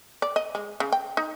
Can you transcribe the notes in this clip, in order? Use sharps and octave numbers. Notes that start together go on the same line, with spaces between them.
D5
D#5
G#3
C#3
G5
D#4